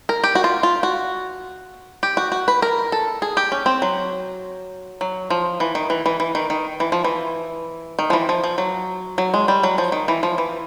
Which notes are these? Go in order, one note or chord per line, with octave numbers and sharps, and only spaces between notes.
A#4
G4
F#4
F4
F4
F#4
G4
F#4
F#4
B4
A#4
A4
G#4
G4
C#4
C4
F#3
F#3
F3
E3
D#3
E3
E3
E3
D#3
D#3
E3
F3
E3
D#3
F3
E3
F3
F3
F#3
F#3
G#3
G3
F#3
F3
D#3
E3
F3
E3